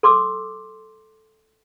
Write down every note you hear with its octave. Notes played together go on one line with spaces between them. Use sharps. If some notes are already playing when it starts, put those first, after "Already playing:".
A4 C6 D6 E6